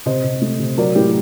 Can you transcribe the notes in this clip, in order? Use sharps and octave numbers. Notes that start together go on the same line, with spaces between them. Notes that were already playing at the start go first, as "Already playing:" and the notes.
C3 C5 D#5
C3
A3
C3
F#3 A#4 D5
A2 G4